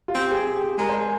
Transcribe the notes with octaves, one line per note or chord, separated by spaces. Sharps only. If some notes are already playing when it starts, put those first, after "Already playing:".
F4
C4 G4
G#4
G4
G#4
G#3 A#4
C5
G#5